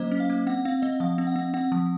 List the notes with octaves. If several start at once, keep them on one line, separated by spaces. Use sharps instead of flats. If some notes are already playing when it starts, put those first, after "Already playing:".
Already playing: F#3 A#3 C#4 C5 D#5
C#4
F5
A#3
C4 F#5
C4 F5
C4 D#5
F3 F5
C4
F#5
C4
C4 F#5
F3